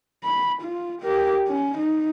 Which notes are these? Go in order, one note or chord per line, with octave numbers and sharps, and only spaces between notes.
B5
F4
G4 A#4
C#4
D#4